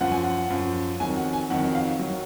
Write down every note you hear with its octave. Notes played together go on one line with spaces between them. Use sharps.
F#2 F3 F#5
G#5
F#5
F#2 F3
F2 D#3 F#3 G#5
F#5
G#5
F2 D#3 F#3 F#5
F5
D#3 F#3